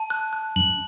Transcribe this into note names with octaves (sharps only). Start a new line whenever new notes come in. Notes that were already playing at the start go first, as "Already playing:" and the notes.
Already playing: A5
F#6
F#6
F#2 F#7